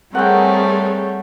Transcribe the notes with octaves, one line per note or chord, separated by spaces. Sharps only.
G3 A3 C4 G#4 A#4 C#5 F#5 G5